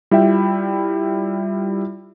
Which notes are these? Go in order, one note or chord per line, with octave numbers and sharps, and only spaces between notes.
G3 E4 F4 E5 G5